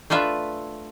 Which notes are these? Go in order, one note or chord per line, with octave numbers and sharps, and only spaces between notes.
A3 D4 F4 B4 E5